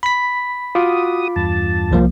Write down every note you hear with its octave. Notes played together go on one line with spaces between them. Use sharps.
B5 B6
F4 F#4 D6 D#6
E2 G2 A5
C2 F3 A#3